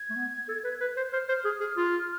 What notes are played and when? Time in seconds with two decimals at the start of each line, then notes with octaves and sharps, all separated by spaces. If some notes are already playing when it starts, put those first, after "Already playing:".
Already playing: G#6
0.10 A3
0.16 B3
0.48 A4
0.64 B4
0.81 B4
0.97 C5
1.12 C5 F6
1.29 C5
1.45 G#4
1.60 G#4
1.77 F4